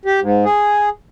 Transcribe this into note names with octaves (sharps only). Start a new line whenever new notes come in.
G4
G#2
G#4